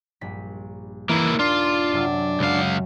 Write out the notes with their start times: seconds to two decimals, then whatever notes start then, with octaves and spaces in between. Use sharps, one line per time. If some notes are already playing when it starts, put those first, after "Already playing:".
0.21 A#1 G2 B6
1.09 D#2 E3 A#3 E4
1.39 D4 F4
1.92 F#2 C3 E6
2.40 C#2 F#2 F5